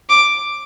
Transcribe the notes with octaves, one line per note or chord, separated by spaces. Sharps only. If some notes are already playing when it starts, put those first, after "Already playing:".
D6